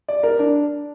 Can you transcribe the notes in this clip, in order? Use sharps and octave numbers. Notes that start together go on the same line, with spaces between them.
D5
A#4
D4